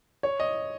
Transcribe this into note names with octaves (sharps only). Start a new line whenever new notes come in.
C#5
D#5